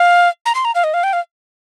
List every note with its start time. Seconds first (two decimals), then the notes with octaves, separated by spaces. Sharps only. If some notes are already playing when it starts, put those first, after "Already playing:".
Already playing: F5
0.46 A#5
0.55 C6
0.65 A#5
0.75 F5
0.84 D#5
0.94 F5
1.03 G5
1.13 F5